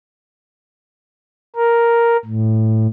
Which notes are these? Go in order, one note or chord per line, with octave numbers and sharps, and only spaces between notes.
A#4
A2